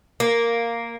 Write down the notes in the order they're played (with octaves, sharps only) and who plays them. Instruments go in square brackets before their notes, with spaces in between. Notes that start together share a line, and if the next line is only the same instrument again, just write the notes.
[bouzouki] A#3